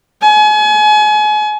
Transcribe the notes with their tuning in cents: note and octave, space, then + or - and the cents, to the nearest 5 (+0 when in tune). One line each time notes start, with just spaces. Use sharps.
G#5 +35